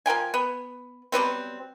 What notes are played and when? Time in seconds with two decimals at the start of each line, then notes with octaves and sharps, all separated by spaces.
0.06 F3 A#4 G5 G#5
0.34 B3
1.12 F#3 G3 B3 C4